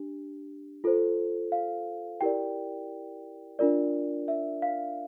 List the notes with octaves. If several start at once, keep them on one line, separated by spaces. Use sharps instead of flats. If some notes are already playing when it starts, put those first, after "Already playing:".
Already playing: D4 G4
F4 A4 C5
F5
E4 G4 A#4 D5 G5
D4 F4 A#4 D5
E5
F5